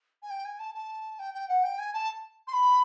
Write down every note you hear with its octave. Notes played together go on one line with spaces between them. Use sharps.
G#5
G5
G#5
A5
A5
G5
G5
F#5
G5
G#5
A5
C6
B5